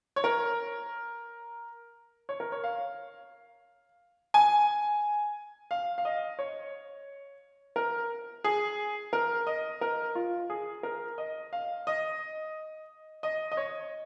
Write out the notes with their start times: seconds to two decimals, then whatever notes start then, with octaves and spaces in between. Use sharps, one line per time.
0.16 C#5
0.24 A#4
2.29 C#5
2.40 A#4
2.52 C#5
2.64 F5
4.34 G#5
5.71 F5
5.98 F5
6.05 D#5
6.39 C#5
7.76 A#4
8.44 G#4
9.13 A#4
9.47 D#5
9.81 A#4
10.15 F4
10.50 G#4
10.83 A#4
11.18 D#5
11.53 F5
11.87 D#5
13.23 D#5
13.52 D#5
13.57 C#5